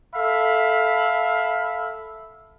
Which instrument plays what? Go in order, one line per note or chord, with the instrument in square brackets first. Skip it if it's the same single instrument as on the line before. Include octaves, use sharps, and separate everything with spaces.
[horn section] A4 E5 F5 B5